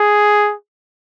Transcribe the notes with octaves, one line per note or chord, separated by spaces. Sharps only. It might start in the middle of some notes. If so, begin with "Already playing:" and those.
Already playing: G#4